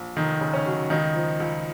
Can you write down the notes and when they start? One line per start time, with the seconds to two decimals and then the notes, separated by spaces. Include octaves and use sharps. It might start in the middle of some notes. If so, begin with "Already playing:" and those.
Already playing: A#1
0.16 F1 D#3 D#4
0.41 C#3
0.54 C#4
0.66 F#3
0.90 C#2 D#3 D#4
1.15 F3
1.40 C#2